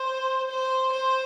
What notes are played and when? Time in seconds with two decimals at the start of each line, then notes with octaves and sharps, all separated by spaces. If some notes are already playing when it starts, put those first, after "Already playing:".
Already playing: C5
0.51 C5
0.92 C5